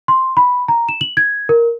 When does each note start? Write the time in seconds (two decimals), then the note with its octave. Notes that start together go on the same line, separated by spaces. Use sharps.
0.08 C6
0.37 B5
0.68 A#5
0.89 E7
1.01 F#7
1.17 G#6
1.49 A#4